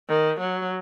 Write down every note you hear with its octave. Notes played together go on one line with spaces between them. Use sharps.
D#3
F#3